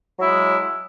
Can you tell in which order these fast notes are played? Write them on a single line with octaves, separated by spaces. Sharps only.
F#3 E4 G#3